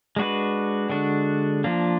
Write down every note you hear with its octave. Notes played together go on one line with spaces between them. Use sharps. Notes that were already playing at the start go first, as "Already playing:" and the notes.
G#3 D4 F#4 B4
D3 G#3 D4 F#4
F3 A#3 D4